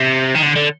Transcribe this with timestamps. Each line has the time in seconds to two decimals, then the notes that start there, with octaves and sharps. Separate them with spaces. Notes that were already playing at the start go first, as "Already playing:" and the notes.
Already playing: C3
0.35 D#3
0.42 D3
0.56 D3